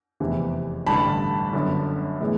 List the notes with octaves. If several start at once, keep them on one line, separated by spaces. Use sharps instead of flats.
F1 E2 C3 E3
A1 G2 D3 A5 B5
G1 F#2 D3
A2 E3 G#3 B3 E4